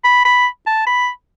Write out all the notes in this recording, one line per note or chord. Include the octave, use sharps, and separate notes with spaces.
B5
B5
A5
B5